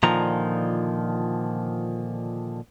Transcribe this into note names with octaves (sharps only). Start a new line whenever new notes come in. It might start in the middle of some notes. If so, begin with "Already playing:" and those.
A#2 D3 D#3 F3 A#5